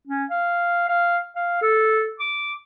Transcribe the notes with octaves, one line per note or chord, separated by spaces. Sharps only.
C#4
F5
F5
F5
A4
D6